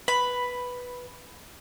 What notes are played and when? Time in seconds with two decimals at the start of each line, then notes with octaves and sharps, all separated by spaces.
0.08 B4 B5